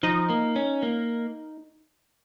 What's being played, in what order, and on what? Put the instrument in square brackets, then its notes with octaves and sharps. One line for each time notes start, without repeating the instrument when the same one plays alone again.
[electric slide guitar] F3 [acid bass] D#4
[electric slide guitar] A#3
C#4
A#3